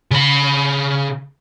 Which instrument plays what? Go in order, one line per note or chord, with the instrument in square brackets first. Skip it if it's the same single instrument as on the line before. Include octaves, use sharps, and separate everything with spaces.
[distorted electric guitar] C#3 B5